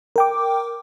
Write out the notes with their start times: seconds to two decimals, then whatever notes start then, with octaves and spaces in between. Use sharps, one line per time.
0.16 A#4 G5 D6